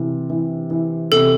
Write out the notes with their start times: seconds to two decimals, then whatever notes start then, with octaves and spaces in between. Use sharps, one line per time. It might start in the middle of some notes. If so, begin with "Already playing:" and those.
Already playing: C3 E3
0.30 E3
0.70 E3
1.12 C3 A4